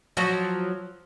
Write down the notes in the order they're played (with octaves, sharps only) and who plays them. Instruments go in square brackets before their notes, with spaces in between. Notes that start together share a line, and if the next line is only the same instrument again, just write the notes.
[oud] F3 F#3 F#4